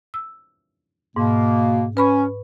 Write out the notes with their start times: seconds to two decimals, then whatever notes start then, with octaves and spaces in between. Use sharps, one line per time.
0.14 E6
1.16 G#2 B2 A#3
1.97 C#4 B4 B5 C#6